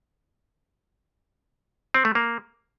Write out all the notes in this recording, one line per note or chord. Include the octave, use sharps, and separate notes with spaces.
C4
A3
A#3